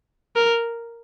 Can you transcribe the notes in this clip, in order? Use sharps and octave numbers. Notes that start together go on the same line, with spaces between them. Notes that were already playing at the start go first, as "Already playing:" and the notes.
A#4